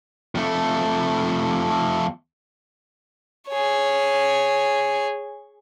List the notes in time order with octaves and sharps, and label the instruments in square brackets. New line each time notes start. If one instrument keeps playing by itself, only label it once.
[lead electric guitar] F2 A3
[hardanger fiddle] G#4 C#5